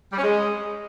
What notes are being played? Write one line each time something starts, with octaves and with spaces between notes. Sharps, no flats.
G3
C#4
G#3